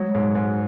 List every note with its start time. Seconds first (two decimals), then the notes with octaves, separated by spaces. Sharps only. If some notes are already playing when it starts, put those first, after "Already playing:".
Already playing: F#3 G#3
0.15 G#2
0.35 G#2